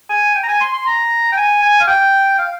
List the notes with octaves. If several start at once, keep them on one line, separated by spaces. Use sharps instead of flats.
G#5
G5
A#5
G#5
C6
C6
A#5
G5
G#5
G#5
F5
G5
F5